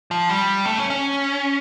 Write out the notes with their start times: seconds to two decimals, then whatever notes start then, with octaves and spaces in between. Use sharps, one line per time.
0.11 F3
0.29 G3
0.65 A3
0.78 C#4
0.90 C#4